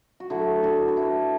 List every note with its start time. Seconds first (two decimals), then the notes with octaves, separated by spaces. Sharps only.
0.20 F#4
0.30 D3 F#3 A3 E4
0.63 D4 F#4
0.88 B4
0.96 E4 A4